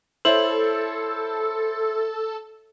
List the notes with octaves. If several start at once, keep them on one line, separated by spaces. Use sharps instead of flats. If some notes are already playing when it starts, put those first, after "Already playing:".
E4 A4 C5 C#5 E5 F#7